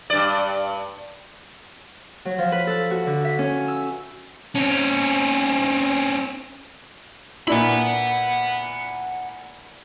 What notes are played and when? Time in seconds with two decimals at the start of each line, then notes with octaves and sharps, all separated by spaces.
0.10 G2 D5
2.25 F#3
2.38 F3
2.52 B4
2.67 A4
2.91 F#4
3.07 D3
3.25 E5
3.39 C#4
3.68 E6
4.55 C4 C#4
7.48 A#2 D4 E4 F#5 B5